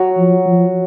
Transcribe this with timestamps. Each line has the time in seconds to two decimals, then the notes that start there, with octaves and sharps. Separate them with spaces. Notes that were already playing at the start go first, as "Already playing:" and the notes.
Already playing: F#3
0.17 F3
0.46 F3